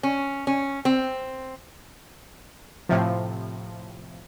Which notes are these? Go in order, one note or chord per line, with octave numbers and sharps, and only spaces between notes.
C#4
C#4
C4
A2 C3 F3